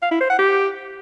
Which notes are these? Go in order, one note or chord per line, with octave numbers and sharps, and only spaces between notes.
F5
E4
C5
F#5
G4